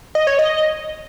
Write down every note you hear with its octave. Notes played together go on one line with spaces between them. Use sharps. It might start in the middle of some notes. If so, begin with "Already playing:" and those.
D#5
C#5
D#5